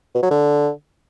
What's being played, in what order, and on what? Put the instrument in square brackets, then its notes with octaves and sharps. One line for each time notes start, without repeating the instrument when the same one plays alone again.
[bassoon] B2
F#3
D3